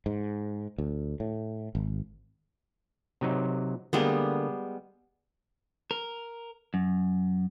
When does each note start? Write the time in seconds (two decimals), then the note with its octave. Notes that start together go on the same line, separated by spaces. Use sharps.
0.06 G#2
0.78 D2
1.20 A2
1.75 G#1
3.21 C3 F#3 D#4
3.93 D3 G3 G#3 A#3 B3
5.91 A#4
6.74 F#2